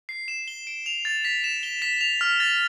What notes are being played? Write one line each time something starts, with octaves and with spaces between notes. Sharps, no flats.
C7
E7
G7
D7
F7
A6
B6
E7
G7
B6
F7
F6
A6